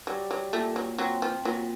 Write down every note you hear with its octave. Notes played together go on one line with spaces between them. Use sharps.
F#3 G3
F#3
A#2 A3
F#3
F#3 C4
F3
A#2 F#3